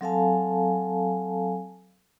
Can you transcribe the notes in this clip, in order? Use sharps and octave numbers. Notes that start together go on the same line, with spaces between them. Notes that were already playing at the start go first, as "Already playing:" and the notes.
F#3 C4 A4 F5 G#5 A5